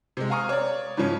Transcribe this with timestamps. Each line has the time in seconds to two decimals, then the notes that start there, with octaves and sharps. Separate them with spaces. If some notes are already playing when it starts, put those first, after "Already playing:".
0.17 C3 G#3
0.30 F5 G#5 A#5 C#6 D#6 F6
0.49 C#5 D5
0.97 G#2 C#3 F3 C#4